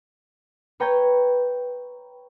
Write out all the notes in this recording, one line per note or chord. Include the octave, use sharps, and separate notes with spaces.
B4 C#5 G5 A#5 G6 G#6